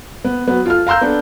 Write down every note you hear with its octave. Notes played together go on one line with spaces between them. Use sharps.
B3
F#3 B3
F4 A4 F6
F5 A#5 C6 E6 G6
B3 D4 A4